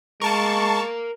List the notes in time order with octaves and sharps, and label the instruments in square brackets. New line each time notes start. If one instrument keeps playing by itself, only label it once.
[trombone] G#3 [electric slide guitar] A#4 F5 [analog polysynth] A5 C#6